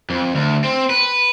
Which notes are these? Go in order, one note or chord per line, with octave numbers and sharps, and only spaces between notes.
F2
D2
C4
B4